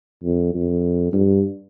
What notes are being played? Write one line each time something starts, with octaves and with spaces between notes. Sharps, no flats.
F2
F2
G2